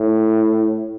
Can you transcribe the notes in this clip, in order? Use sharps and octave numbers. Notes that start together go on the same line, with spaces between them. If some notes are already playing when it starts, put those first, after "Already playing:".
Already playing: A2